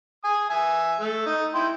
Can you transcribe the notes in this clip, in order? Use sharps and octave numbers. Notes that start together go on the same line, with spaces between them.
G#5 D#6
E5 G#5
A3
D#4
E4 G5 C6